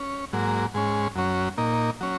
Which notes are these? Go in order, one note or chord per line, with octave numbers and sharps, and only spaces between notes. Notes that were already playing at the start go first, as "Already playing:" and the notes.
Already playing: C#4
G#2 F#3 A#3
G#2 G#3 C#4
F#2 F#3 C#4
A#2 A#3 D#4
F#3 C#4